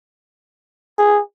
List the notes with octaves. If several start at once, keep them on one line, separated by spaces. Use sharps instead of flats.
G#4